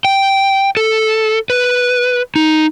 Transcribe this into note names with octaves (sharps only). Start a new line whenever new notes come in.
G5
A4
B4
D#4